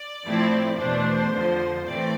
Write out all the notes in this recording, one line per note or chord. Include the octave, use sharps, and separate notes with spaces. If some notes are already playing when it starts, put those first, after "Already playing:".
Already playing: D5
A2 F3 A3 C4 E4
E2 B2 A3 D4 C5
F2 D3 F3
A2 E3 A3 C4 D5